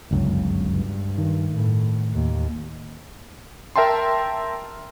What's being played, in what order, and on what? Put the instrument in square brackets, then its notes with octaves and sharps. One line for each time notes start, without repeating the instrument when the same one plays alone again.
[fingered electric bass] G1 C#2 F#2 [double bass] C#3
[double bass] G2
[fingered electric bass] D#3
[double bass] A2
D#2
[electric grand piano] A#4 E5 G5 A5 C6